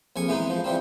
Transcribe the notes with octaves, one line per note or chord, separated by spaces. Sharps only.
A#1 F2 G#5 C#6
E3 G#3 B3 D#4
F3
E3 F3 G3 C4